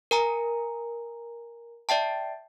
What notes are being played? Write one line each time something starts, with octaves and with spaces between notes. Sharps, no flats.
A#4 G#5 A#5
D5 E5 G5 A5